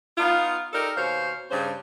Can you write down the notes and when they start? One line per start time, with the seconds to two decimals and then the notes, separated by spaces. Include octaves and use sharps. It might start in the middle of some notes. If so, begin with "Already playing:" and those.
0.18 B3 D#4 F4
0.73 D#4 G4 A4 A#4 D5
0.97 D#2 B2 C5 C#5 F5
1.50 G2 C#3 C#4 C5